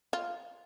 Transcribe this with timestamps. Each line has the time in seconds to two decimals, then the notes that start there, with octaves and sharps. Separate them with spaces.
0.13 F4